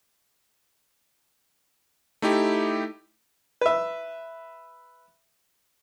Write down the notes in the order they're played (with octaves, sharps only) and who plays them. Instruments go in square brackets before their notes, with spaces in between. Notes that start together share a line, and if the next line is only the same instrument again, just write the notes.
[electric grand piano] A3 D#4 E4 G4
[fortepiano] B4 E5